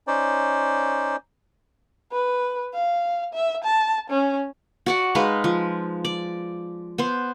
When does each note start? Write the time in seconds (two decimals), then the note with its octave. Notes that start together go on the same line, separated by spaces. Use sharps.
0.07 C#4 D#4 C5 D5
2.12 B4
2.74 F5
3.34 E5
3.64 A5
4.10 C#4
4.86 F#4 D5 F#5
5.15 G#3 D#4 B4 F5
5.44 F3
6.05 D5
6.98 B3 C5